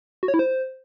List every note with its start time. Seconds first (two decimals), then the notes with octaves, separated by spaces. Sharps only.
0.23 F#4
0.28 C#5
0.34 E4
0.39 C5